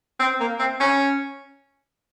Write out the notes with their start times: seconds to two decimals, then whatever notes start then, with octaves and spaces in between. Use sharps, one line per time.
0.19 C4
0.40 A#3
0.59 C4
0.80 C#4